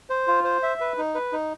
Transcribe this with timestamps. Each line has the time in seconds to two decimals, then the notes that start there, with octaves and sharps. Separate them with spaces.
0.10 C5
0.28 F4
0.44 C5
0.63 E5
0.80 B4
0.98 D#4
1.15 B4
1.33 D#4